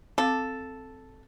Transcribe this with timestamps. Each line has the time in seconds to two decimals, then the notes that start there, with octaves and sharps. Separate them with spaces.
0.18 C4 A4 F5 D6